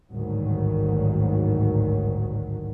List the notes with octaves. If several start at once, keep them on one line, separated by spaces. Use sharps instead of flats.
A1 D2 G#2 D#3 F#3 G3